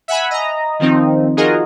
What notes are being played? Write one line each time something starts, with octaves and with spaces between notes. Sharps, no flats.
E5 F#5 G#5 B5
D#5 A#5
D#3 F3 C4 D#4
D#4 F4 F#4 G#4 A#4 D#5